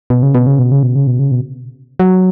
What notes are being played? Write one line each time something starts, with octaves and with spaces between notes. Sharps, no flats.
B2
C#3
B2
C#3
B2
C#3
B2
C#3
B2
C#3
B2
F#3